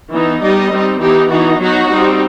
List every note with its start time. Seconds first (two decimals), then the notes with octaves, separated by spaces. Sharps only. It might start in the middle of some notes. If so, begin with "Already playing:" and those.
0.11 E3 B3 D#4
0.41 G3 B3 D#4 D#5
0.71 G3 C4 D#4
1.00 E3 B3 D#4 G4
1.29 E3 B3 D#4 F#4
1.59 F#3 B3 D#4 F#4
1.88 G3 C4 D#4